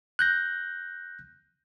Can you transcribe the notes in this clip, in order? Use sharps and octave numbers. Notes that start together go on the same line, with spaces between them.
F#6 G6 A#6